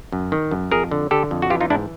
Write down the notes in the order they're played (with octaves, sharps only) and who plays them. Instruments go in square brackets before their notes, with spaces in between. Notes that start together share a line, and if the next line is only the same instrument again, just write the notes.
[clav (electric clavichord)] F#2
D#3
F#2
F2 G#4 A#4
D3
D3 G4 A4
F2
F#4
E3 F4 G4
D#4 F4
G#2 D4 E4